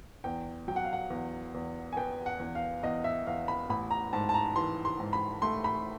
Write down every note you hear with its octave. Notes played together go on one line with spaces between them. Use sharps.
E2 G5
F#3 G5
F#5
F5
F#5
E2
E2
G#5
B3 G5
F#5
E2
F5
E2 D#5
E5
E2 F5
B5
A1 B5
A#5
G#2 A5
A5
A#5
E3 C6
C6
G#2
B5
A3 C6
B5